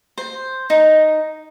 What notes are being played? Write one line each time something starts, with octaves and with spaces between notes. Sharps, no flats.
C5
D#4